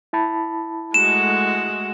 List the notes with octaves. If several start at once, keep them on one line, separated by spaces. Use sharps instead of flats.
E4 A5 B5
G#3 A3 F#4 E7